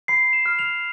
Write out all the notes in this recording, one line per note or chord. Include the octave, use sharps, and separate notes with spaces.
B5 C7
E7
F6
F7